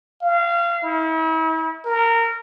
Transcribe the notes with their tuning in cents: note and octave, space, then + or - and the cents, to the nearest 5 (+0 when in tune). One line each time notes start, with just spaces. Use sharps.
F5 -25
E4 -40
A#4 -20